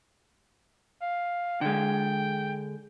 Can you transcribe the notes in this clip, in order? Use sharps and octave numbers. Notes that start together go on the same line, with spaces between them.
F5
D3 G#3 G5